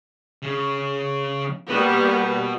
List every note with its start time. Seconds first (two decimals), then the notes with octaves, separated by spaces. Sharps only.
0.42 C#3
1.70 G3 A#3 B3 F#4 B4